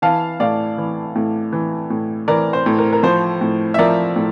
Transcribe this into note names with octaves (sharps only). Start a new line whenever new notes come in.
E3 F5 A5
A2 D5 F5
E3
A2
E3
A2
E3 A#4 D5
C5
A2
A#4
A#4
F3 C5
A2
E5
F3 A#4 D5
A2